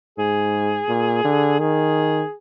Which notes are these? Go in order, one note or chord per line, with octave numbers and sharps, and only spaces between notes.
G#2 G#4
A#2
D3
D#3 G#4